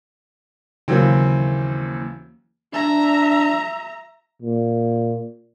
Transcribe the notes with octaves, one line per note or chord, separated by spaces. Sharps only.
D#2 C#3 E3 F#3 A#3 C4
D4 E5 A#5
A#2